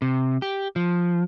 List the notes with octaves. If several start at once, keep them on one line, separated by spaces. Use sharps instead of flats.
C3
G4
F3